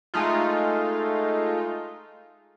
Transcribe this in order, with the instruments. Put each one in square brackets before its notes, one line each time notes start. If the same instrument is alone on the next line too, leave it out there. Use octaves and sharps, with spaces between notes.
[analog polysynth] G#3 A3 D#4 F4